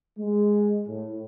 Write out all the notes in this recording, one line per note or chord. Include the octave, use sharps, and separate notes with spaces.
G#3
A2